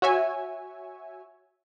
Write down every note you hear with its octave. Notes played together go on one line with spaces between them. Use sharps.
F#4 C#5 E5 G#5